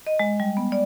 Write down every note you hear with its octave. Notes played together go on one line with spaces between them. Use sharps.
D#5
G#3
G3
B3
D5